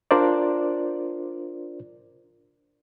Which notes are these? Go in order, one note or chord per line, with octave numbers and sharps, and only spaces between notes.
D4 F4 A#4 C5 D5